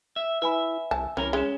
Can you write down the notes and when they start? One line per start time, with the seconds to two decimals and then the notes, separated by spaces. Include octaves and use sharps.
0.16 E5
0.42 E4 B4 E5 G#5 B5
0.91 C2 G#5 A5
1.17 C2 E3 C#4 A#4
1.33 G#3 C#4 E7 G7